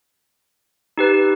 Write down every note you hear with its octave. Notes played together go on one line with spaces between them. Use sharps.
D#4 G4 B4